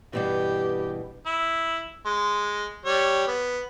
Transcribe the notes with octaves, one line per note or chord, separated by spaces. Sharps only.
G2 B2 E3 G4
E4
G#3
G3 C#5
B3